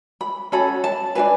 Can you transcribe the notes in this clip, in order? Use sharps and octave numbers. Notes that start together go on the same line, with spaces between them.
B5
C#4 F#4 A4 B5
A5
D4 F#4 B4 G#5